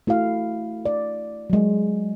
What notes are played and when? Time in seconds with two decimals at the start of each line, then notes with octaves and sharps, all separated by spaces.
0.07 A3 E4 F#4 F5
0.86 D5
1.50 F#3 G#3